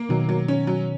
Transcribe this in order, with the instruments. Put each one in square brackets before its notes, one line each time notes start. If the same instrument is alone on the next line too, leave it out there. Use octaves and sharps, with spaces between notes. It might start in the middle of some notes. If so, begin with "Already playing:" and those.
Already playing: [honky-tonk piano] A#3
[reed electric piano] B2 D#3 [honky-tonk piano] F#3
[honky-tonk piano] F#3
C#4
F#3